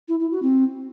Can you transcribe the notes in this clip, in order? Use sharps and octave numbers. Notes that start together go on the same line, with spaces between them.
E4
E4
F#4
C4